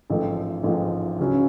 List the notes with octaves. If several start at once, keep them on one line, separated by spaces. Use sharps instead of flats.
A1 G#2 F3 A3
A1 G#2 F3 A3
C#2 C#3 F#3 C#4